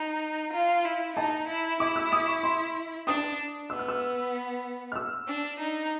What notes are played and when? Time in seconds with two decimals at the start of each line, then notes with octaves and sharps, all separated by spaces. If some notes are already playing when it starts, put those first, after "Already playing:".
Already playing: D#4
0.53 F4
0.85 E4
1.16 D#4 A5
1.48 E4
1.80 E4 D6
1.96 E6
2.12 D#6
2.27 C#6
2.43 C6
3.07 D4 D#6
3.70 B3 E6
3.79 F6
3.88 E6
4.92 F6
4.96 E6
5.28 D4
5.60 D#4